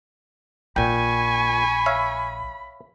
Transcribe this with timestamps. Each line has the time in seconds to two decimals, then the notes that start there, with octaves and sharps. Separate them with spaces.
0.76 A#1 A#2 G5 G#5 B5 C#6
1.86 C#5 E5 F5